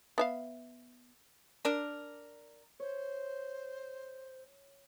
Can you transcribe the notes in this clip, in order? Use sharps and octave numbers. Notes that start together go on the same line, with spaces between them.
B3 E5 F5
D4 A#4
C5 C#5